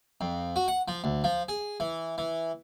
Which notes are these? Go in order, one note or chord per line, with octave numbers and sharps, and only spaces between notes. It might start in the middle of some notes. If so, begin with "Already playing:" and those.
F2
F#4
F#5
F3
D2
F3
G#4
E3
E3